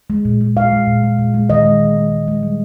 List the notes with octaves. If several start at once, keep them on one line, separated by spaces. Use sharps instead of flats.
G#3
A#2
G#3
A#2 F5
G#3
A#2
G#3
A#2
G#3
D#3 D#5
G#3
D#3
G#3
D#3
G#3
G3